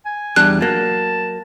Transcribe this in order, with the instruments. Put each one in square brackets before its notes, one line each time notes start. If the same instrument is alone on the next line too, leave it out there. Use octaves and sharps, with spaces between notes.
[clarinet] G#5
[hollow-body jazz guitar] E2 G3 D4 [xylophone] F#6
[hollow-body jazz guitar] F#3 A#3 [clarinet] A5